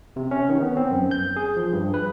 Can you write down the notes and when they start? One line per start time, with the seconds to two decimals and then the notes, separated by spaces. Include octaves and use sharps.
0.16 C3
0.31 C#4
0.49 D#3
0.62 B3
0.77 C4
0.91 F#2
1.11 G6
1.36 G#4
1.57 F3
1.73 G2
1.94 B4